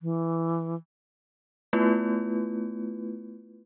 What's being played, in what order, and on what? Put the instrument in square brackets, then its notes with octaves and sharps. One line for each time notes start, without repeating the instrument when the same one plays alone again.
[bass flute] E3
[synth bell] A3 B3 E4 F4 B4